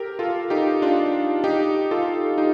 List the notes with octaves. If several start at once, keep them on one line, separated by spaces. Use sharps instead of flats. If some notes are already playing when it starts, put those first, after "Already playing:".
Already playing: G4 A4 A#4
F4 A4
D#4 G4
D4 F4
D#4 G4
F4 A4
D#4 G4